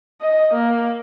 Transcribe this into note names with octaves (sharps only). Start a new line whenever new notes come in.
D#5
A#3